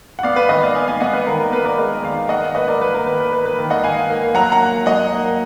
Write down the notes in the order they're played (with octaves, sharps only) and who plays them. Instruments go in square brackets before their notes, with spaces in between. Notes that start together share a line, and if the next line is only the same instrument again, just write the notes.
[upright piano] F#5
B3 D5 F5
B4
D#3 B4 D#5
D5 F5
B3 F5 G#5
F5 G#5
B3 D#5 F#5
B4
D#3 A#4
A#4
B3 B4
A#4 D5
G#3 B4 D#5
D#3 D5 F5
D#3 D#5 F#5
A#3 B4 D#5
A#4 D5
A#3 B4
A#4
D#3 B4
B4
A#3 B4
B4
D#3
D#5 F#5
D#3 F5 G#5
A#3
F#3 F#5 A#5
F#5 A#5
A#3
F#3 D#5 F#5
A#3